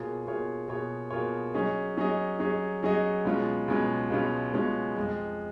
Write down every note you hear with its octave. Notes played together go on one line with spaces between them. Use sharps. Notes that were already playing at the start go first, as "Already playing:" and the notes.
Already playing: B2 A#3 F4 G#4 C#5
B2 A#3 F4 G#4 C#5
B2 A#3 F4 G#4 C#5
B2 A#3 F4 G#4 C#5
F#3 C#4 G#4 D#5
F#3 C#4 G#4 D#5
F#3 C#4 G#4 D#5
F#3 C#4 G#4 D#5
C#2 B2 G#3 C#4 F4
C#2 B2 G#3 C#4 F4
C#2 B2 G#3 C#4 F4
C#2 B2 G#3 C#4 F4
F2 F3 G#3